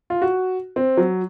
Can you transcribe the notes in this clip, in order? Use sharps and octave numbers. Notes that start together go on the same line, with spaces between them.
F4
F#4
C4
F#3